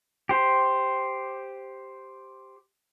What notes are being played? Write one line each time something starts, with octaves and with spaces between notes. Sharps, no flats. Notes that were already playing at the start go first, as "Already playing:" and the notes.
G4 C5